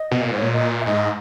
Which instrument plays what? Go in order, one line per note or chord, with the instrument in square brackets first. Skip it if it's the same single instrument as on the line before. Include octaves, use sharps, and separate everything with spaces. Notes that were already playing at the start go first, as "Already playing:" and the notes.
Already playing: [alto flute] D#5
[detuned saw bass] B2
A#2
[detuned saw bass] G#2 [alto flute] B4
[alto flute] C#5
[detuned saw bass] A#2
[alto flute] D#5
E5
[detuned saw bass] G#2 [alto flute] D#5